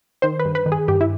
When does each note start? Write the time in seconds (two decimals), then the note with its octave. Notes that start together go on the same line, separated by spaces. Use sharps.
0.22 D#3 C5
0.39 B4
0.45 G2
0.55 B4
0.66 D#3
0.72 G#4
0.88 G2 G4
1.01 E4